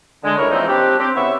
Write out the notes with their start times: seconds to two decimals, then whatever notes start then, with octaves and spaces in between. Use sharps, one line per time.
0.24 D3 G#3
0.38 C#2 G#3 E4 A#4 C#5
0.51 E3 F3 A#3 C4 D#4 E4
0.68 C4 D4 G4
0.98 C4 G4
1.15 C#3 B3 E4 E5 C#6 E6